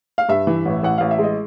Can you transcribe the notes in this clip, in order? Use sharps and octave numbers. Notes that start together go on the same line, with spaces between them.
F5
G2 E5
E3
A1
A1 F#5
A1 F5
E5
G#3
D#5